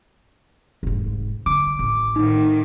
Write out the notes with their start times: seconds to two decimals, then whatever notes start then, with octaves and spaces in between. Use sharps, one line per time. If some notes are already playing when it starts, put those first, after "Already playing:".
0.83 F1 G#2
1.46 D3 D6
1.79 A1
2.16 A2 D#3 D#4